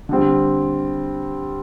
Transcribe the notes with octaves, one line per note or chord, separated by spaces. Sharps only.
D3 G3 C4